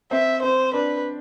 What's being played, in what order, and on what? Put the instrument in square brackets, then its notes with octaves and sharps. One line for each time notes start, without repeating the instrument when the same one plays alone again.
[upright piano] C4 [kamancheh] E5
[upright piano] C4 [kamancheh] C5
[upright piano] D4 [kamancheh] B4